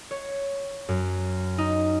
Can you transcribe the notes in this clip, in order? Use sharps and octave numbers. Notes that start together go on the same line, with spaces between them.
C#5
F#2
D#4